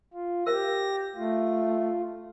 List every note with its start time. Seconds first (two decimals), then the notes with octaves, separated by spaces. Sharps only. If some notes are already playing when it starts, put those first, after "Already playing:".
0.14 F4
0.47 G4 A#4 C5 F5 A#6
1.15 A3 F4